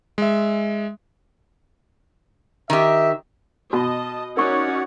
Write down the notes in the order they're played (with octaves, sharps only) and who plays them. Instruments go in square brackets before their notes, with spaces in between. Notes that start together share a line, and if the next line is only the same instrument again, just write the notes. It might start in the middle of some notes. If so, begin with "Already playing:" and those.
[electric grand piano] G#3 E5
[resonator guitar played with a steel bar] D#3 G4 [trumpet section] E5
[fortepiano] B2 [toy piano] F#4 [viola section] D#5 [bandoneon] A5
[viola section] C#4 D#4 F#4 [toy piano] A#4 C#6 [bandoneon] C#5 D5 F#5